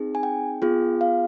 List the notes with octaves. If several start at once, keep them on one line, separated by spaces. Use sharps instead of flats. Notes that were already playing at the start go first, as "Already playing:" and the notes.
Already playing: C4 D#4 G#4
G#5
G5
B3 F4 G#4
F5